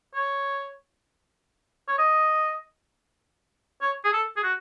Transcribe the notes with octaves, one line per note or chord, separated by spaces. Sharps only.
C#5
C#5
D#5
C#5
G#4
A4
G#4
F#4